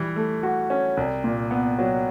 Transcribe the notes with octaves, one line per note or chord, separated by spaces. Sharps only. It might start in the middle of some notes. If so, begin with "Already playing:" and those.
Already playing: E3 G3
A3
F#4
C#4
C2
A#2
B3
F#3